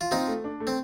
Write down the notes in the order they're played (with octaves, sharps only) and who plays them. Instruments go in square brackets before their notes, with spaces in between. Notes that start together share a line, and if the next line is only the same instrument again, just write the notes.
[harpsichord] F4
[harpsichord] C4 D#4 [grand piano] F4
[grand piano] A3
D4
A3
[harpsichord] C4